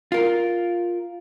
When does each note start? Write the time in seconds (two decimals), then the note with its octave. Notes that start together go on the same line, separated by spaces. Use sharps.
0.12 F4 A#4